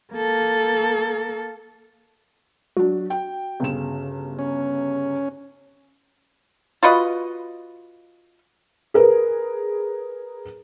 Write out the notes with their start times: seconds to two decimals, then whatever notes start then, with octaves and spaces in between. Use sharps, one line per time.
0.13 A#3 A4
2.77 F#3 D4 F#4
3.10 G5
3.60 G1 C#3 E7
4.39 C#4
6.83 F4 F#4 B4 D#5
8.94 G#4 A#4 B4